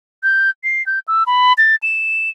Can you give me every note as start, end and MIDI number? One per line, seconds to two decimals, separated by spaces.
0.23 0.50 91
0.64 0.85 96
0.86 0.99 91
1.08 1.23 88
1.26 1.53 83
1.58 1.75 93
1.83 2.30 100